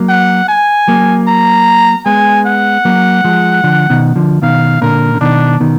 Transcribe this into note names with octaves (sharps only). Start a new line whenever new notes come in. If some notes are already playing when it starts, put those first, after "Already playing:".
Already playing: F#3 A#3
F#5
G#5
F#3 A#3
A#5
G#3 B3 G#5
F#5
F#3 A#3
F3 G#3
D3 F3
B2 D#3
D3 F3
B2 D#3 F5
A#2 D3 A#4
D3
B2 D#3 D4
B2 D#3